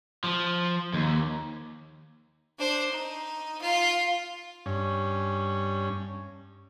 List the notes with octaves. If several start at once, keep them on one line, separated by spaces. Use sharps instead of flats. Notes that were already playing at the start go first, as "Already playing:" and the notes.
F3
D#2
D4 C5
D#4
F4
G2 C#4